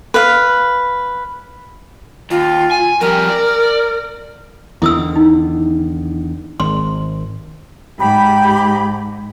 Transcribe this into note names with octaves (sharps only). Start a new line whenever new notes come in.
B4 F5
D#2 F4
G#5
F2 G3 A#4
D5
E2 D3 D#3 E4 D#6 E6
D#4
G#1 C6
G#2 G4 B5